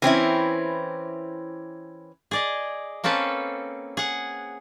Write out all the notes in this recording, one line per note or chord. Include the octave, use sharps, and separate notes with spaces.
E3 C4 C#4 E4
G#4 D5 D#5
A#3 C4 C#4 A4 B4
G#4 F#5